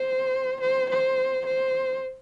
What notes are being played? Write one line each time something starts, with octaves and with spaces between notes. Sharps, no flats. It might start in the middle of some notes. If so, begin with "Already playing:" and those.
Already playing: C5
C5
C5
C5